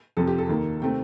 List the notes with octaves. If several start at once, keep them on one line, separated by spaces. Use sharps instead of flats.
F2 C3 F3 A4
G4
A4
D#2 D#3 A#3
C3 D#3 A3 C4 G5